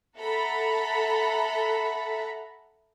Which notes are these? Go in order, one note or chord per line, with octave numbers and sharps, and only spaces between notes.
A4 E5 F#5 A#5 B5